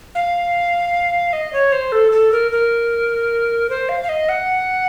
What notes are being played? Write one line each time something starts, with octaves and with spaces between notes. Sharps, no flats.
F5
D#5
C#5
C5
A4
A4
A#4
A#4
C5
F5
F5
D#5
F#5